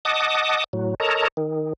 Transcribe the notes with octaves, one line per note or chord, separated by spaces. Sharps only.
D#5 F#5 A5 D6 D#6
A2 F#3
A4 A#4 C#5 D#5 A5 A#5
D#3